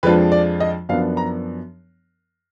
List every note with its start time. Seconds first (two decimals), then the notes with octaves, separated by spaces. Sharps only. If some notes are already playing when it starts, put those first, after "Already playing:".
0.03 F2 F3 G#3 D4 F4 B4
0.32 D5
0.60 D#5
0.89 F#2 F3 B3 D4 F5
1.17 A#5